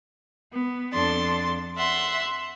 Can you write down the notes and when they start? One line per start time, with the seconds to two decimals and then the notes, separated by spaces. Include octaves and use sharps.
0.52 B3
0.93 F2 D4 A4 C6 A6
1.77 E5 F#5 C6